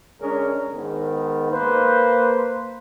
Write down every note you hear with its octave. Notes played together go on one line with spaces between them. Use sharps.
D3 G#3 C#4 D4 G#4 A#4
G#2 D#3 B3
A#3 B4 C5